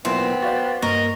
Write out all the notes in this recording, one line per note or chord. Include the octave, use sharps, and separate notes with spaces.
B1 A#2 E3 B3 C4
F#4 C5 D5 F5 A6
G2 A#3 A#4 D#5 C#6